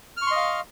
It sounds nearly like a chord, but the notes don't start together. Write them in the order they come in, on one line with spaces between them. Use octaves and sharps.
F6 C#6 C6 D#5 F5